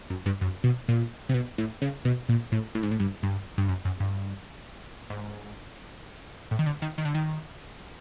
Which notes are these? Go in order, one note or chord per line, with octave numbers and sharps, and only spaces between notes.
F#2
G2
F#2
B2
A#2
C3
B2
A2
C#3
B2
A#2
A2
A2
G#2
A2
G2
G2
G2
F#2
F#2
G2
G#2
A2
D#3
D3
D#3
D#3
D3
D#3